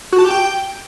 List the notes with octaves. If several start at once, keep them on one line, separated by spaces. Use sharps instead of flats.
F#4
A5
G4
G5